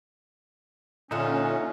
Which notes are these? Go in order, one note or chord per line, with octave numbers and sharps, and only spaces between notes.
A#2 D3 C#4 D#4 F4 E5 F#5